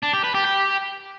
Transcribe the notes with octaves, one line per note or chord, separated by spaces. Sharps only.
D4
G4
B4
G4
G4